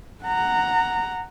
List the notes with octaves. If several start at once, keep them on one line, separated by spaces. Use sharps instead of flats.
F#5 A#5